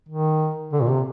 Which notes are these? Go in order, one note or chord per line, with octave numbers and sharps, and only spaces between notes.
D#3
D3
A#2
C3